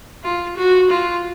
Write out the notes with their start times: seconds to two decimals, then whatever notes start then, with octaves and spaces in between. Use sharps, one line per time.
0.24 F4
0.57 F#4
0.90 F4